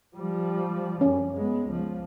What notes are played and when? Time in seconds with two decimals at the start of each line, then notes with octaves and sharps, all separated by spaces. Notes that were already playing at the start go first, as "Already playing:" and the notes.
0.17 F3 G3
1.01 F#2 C#4
1.35 G#3 B3
1.68 C#2 F3